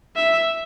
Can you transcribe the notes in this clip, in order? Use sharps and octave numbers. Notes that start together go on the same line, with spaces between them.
E5